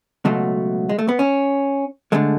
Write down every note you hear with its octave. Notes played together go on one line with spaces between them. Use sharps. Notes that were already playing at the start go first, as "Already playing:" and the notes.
C#2 B2 F#3 A3
G#3
A3
B3
C#4
D3 G#3 A3